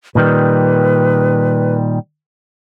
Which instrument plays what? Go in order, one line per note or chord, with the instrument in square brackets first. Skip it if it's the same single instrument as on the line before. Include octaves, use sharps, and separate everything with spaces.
[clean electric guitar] A#2 D#3 G3 [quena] B4